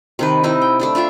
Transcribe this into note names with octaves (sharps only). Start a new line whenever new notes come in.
C3 D#3 B4
C4 D#4 E4
G5
A3 D4 E4
D4 F4 E5 G5